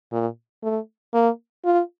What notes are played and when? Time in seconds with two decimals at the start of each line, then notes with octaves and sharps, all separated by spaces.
0.12 A#2
0.63 A3
1.14 A#3
1.65 F4